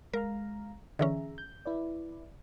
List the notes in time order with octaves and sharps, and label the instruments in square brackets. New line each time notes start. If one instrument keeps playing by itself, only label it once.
[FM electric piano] G#3 F5 A#5 [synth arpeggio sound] A#4
[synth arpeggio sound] D3 E3 C#4 [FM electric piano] G#4 E5 A#5
[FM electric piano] G6
E4 B4 D5